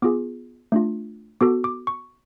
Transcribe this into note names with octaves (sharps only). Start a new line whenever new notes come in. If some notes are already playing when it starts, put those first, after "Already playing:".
B3 F4 G#4 D6
A3 D4 F4
B3 F#4 A4 D6
D6
C#6